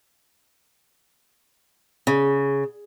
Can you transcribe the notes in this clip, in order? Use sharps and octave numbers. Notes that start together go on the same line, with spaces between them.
C#3